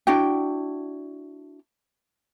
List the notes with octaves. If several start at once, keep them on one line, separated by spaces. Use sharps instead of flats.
D4 E4 F#4 G5